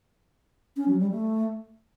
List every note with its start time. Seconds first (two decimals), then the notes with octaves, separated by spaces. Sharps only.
0.77 C#4
0.88 F#3
0.99 G3
1.11 A3